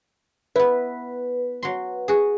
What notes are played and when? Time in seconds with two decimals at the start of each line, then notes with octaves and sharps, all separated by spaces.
0.56 B3 E4 B4
1.63 F#3 C6
2.08 F#4 G#4